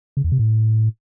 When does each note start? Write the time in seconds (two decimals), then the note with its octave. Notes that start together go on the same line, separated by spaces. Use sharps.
0.17 C#3
0.24 E2
0.32 C3
0.39 A2